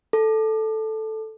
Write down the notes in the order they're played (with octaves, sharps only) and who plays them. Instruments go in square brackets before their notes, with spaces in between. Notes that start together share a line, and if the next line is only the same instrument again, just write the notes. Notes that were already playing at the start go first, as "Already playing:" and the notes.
[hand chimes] A4